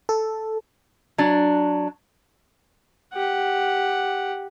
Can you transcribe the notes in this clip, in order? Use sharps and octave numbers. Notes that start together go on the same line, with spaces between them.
A4
F#3 D4
G4 F#5